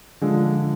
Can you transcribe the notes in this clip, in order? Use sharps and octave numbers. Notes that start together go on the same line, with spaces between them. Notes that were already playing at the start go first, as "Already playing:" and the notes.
D3 F3 G#3